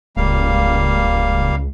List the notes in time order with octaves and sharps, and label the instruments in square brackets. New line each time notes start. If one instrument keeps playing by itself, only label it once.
[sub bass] D1 [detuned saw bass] C#2 [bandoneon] G3 A#3 F5